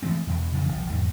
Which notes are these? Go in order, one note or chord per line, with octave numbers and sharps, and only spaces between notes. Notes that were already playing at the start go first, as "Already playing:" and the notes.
E3 G#3 A3 C4
E2 B2
F2 C#3 E3 F3
D#1 B1 F3
E2 G#2 B2 D#3